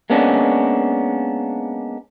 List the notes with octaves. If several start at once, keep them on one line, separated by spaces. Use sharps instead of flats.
G#3 A#3 B3 C#4 D4